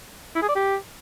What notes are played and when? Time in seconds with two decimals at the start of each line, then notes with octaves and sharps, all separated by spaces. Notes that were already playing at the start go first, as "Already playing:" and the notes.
0.35 E4
0.42 G#4
0.49 D5
0.55 G4